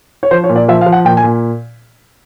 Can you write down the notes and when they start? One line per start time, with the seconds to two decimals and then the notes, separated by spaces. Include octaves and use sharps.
0.23 C#5
0.31 F3 C5
0.44 C#5
0.49 A#2
0.56 D5
0.68 F3 E5
0.81 F5
0.86 F3
0.92 F#5
1.05 A#2 G5
1.17 G#5
1.24 A#2